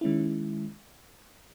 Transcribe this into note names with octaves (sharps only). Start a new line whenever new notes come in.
D#3 G#3 C#4 E4